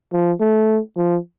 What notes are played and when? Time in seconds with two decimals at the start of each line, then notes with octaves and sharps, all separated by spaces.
0.12 F3
0.40 A3
0.97 F3